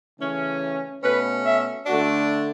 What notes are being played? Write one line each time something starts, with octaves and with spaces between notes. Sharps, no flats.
C#3 E3 A3 C#4
B2 A3 C#4 B4
E5
D3 A3 D4 F#4